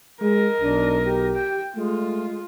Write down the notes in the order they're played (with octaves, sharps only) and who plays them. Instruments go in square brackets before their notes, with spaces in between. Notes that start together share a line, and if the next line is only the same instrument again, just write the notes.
[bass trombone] G#3 [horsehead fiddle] A#4 D#5
[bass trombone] B1 [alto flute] D4
[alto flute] G4
[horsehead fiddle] G5
[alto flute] G#3 [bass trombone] A3 [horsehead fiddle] F4